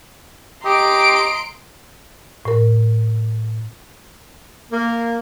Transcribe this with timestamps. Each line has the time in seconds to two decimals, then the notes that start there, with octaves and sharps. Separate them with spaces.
0.65 G4 D#5 A#5 C6 D7
2.45 A2 A#4
4.72 A#3